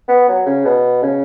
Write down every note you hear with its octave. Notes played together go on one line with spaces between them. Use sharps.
B3
F#3
C#3
B2
C#3